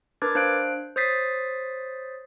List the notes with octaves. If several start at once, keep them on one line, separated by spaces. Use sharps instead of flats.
D4 A#4 B4 D6 G#6 A6
D4 C5 F5 F#6 D7
C5 C#5 D#6 A6 B6 C7